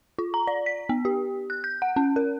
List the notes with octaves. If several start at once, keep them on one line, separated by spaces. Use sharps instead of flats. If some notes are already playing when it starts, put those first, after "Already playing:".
F4
A#5
D5
B6
B3
G4
F#6
G6
F#5
C#4
A#4